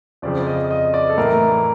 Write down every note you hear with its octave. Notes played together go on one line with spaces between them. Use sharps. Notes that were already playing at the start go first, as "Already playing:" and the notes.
F2 C#3 F3 D5
D#5
D#5
D5
A4
A2 E3 A#4